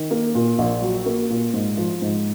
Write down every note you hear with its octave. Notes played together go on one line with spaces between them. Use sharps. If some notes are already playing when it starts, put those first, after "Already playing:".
Already playing: D#3
A#3
A#2
A#1
F#3
A#3
A#2
G#2
F3
G#2